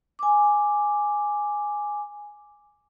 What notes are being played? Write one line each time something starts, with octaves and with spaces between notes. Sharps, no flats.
G#5 D6